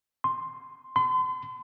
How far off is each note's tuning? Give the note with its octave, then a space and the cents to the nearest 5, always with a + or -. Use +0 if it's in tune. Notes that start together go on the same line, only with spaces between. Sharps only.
C6 +5
C6 -40